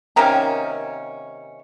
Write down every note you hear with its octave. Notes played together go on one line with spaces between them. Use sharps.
C3 D#3 A#3 C#4 A#4 A#5